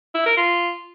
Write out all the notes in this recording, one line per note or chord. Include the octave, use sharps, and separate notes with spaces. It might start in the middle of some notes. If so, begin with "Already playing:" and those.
E4
A#4
F4